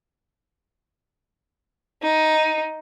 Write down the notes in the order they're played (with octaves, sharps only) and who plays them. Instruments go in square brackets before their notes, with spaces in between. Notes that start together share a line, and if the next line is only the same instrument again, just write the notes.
[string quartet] D#4